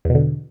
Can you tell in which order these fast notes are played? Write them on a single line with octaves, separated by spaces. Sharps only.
E2 B2 D3